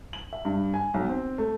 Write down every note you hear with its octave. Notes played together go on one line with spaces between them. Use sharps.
F#7
E5
G2
G#5
B1
C4
A3